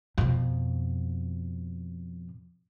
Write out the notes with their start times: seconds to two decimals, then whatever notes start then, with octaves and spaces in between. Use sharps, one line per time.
0.18 F2 B2